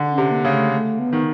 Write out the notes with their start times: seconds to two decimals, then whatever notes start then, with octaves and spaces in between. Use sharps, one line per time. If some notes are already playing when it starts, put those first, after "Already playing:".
Already playing: D3
0.11 C#4
0.18 C3
0.31 A#3
0.45 C#3
0.52 A3
0.72 A3
0.99 B3
1.13 D#3